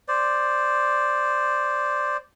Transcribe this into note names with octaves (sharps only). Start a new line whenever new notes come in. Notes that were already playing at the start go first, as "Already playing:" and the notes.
C5 D5